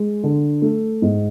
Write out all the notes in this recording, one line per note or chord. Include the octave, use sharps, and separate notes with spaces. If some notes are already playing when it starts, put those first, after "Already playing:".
Already playing: G#3
D3
A3
G#2